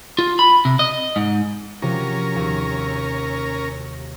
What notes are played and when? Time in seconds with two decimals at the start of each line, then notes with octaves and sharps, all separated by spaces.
0.19 F4
0.39 B5
0.65 C3
0.79 D#5
1.16 G#2
1.82 C3 F3 C#4 F#4 A#4
2.35 D#2 C3